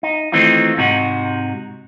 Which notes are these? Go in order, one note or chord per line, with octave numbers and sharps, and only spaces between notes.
D#4
D#3 E3 A3 C4 D#4 F4
G#2 C3 D#4 F#4